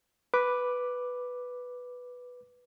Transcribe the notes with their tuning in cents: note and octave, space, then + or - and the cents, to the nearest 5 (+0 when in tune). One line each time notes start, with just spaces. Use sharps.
B4 +0 D6 +0